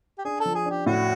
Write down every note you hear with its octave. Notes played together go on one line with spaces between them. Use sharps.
G4
D4 G#4
A4
F3
G#4
D4 G4
A2 F#4